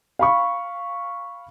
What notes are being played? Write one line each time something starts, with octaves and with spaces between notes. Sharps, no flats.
F5 B5 C#6